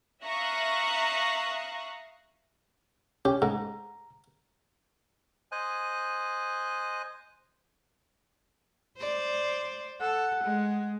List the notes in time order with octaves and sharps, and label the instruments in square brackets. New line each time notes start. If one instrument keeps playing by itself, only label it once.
[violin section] E5 F5 A#5 C#6 D#6 F#6
[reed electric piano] C#4 [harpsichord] G4
[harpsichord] G#2 [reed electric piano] A#5
[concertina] C5 D#5 G#5 F#6
[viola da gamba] C5 D5
[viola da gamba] A4 [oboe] F#5
[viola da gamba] G#3